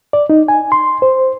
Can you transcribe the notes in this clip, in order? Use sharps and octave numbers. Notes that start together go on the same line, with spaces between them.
D5
D#4
G#5
C6
C5